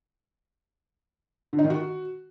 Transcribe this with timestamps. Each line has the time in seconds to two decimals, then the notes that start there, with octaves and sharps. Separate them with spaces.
1.53 D3
1.59 D#4
1.64 D#3
1.70 F#4